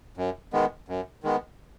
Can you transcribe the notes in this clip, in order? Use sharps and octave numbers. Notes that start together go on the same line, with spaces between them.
F#2
D#3 G#3 B3
F#2
D#3 G#3 B3